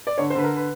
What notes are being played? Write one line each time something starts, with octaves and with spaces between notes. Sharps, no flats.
D5
D3 C#5
C5
D3 B4
A#4
B4